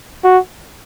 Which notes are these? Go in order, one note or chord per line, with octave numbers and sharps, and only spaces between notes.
F#4